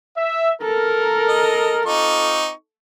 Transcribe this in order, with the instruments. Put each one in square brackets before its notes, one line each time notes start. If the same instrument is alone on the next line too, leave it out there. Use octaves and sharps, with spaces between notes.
[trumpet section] E5
[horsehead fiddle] A4 [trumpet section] A#4
[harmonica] D#5
[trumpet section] C4 F4 D6 [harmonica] D#4 C#6